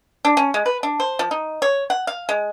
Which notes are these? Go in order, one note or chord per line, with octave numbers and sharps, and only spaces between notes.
D4
C#4
G#3
B4
D4
C5
F3
D#4
C#5
F#5
F5
G#3